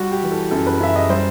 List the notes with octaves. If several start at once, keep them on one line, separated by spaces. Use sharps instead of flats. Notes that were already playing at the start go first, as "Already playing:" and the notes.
Already playing: G3 F#4
G4
E3
A4
F#2 A4
B4
F#2 E5
D#5
G3 C5